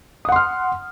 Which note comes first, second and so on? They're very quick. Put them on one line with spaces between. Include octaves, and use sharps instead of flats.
D#6 F#5 C6 F6